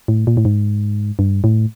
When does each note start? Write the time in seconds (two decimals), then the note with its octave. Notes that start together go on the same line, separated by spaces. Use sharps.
0.08 A2
0.27 A#2
0.37 A2
0.45 G#2
1.19 G2
1.44 A2